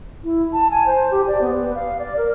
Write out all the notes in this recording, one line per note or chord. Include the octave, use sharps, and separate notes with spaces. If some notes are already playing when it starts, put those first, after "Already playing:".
E4
A5
G#5
C5
G4
D5
B3
B4
F5
D5
A#4